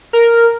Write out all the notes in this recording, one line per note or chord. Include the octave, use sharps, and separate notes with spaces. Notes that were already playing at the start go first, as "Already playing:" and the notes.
A#4